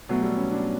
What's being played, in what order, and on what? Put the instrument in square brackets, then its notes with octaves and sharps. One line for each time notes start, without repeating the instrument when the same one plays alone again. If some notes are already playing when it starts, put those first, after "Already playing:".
[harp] B2 A3 E4 [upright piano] F#3
[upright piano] G3
C#4
D4